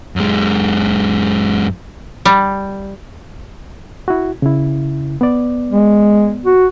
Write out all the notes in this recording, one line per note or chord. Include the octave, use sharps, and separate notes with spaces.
F#2 G#3
G3
E4 F#4
C#3 E4
B3 D5
G#3
F#4